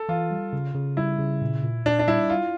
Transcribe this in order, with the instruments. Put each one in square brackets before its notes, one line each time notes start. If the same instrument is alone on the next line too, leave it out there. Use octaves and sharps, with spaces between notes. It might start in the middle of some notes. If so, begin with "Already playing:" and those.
Already playing: [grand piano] A4
[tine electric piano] E3 [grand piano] F4
[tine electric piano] G3
C#3
C#3
[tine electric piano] G3 [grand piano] E4
[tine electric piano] C#3
A#2
A#2
[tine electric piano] A#2 [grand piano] D4
[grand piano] D4
[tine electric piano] G3 [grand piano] E4
[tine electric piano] E4 [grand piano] F4